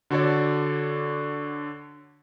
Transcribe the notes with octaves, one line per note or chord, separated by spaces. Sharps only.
D3 F#4 A4 C#5 D5